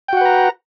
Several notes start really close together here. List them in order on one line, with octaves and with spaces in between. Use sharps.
G5 F#4 F#5 B4 A#5